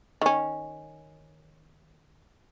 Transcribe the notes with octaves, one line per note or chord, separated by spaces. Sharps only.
D#3 C#4